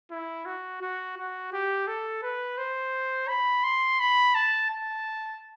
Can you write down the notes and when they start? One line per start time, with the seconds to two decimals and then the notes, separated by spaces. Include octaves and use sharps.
0.11 E4
0.46 F#4
0.82 F#4
1.17 F#4
1.53 G4
1.87 A4
2.23 B4
2.58 C5
3.28 B5
3.64 C6
4.00 B5
4.35 A5
4.70 A5